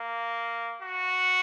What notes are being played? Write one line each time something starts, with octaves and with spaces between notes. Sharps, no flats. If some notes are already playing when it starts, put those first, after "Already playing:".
Already playing: A#3
F#4